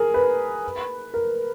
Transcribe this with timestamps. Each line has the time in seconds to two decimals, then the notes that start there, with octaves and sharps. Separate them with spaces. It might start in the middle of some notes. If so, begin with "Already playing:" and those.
Already playing: G#4 A#4
0.14 B4
1.14 A#4